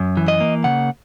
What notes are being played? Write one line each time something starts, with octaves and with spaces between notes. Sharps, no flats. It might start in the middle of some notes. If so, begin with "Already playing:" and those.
Already playing: F#2
E3
D#5
A#3
C#3 F#5